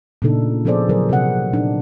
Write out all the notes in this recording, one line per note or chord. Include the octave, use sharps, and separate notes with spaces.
A#2 C#3 A3 D4 D#4 A4
F3 B3 G#4 A4 C5 D5
D3 F#3 G#4 A#4 C5
C3 C4 G#4 F#5
A#2 D4 D#4